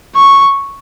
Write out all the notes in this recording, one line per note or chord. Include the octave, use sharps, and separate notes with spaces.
C#6